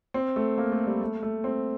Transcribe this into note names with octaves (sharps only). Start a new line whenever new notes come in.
C4
A3
A#3
A3
G3
A3
A3
C4